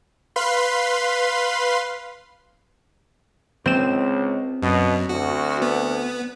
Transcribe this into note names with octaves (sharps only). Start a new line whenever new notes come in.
B4 F5 B5 C6
C#2 C4 E7
F#2 B2
D2 F#4
B3